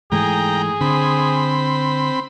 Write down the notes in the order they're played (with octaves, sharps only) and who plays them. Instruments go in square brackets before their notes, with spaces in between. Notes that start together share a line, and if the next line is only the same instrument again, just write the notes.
[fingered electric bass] G#2 E3 A3 [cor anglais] G#4 [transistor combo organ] G5 A#5
[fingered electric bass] D3 [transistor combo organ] C4 B5